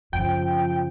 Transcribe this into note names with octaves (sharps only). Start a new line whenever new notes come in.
F#2 C#3 F3 G5